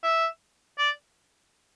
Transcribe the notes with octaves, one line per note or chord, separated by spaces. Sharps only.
E5
D5